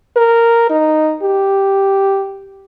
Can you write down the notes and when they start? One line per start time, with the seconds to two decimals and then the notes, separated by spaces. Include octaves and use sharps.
0.16 A#4
0.70 D#4
1.22 G4